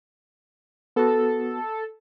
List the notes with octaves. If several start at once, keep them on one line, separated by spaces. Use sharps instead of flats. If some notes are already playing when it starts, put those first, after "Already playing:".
B3 F#4 A4